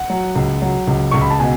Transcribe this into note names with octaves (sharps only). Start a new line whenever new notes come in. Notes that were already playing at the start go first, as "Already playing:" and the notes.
Already playing: F#5
F#3
C#2
F#3
C#2
C#2 C#6
B5
A5
B2 G#5